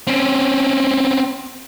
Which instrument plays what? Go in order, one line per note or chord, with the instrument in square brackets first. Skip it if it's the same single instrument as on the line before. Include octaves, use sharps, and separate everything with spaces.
[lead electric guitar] C4 C#4